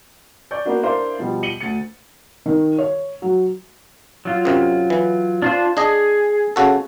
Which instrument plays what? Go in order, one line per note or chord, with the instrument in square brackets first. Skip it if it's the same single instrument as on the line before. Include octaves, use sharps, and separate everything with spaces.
[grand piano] D5 C#6 G6
A#3 B3 D4 F#4
D4 E4 A#4 C5 D5 F5
B2 F3 G3
C#7 D#7 F#7 G7
D2 A6 C#7
[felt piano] D#3
C#5
F#3
[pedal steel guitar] F#3 F4
[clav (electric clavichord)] F#2 C3
E3
[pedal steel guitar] D4 F4 C5
[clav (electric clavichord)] D4 D#5 [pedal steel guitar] G#4
[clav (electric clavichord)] C#3 F#4 A4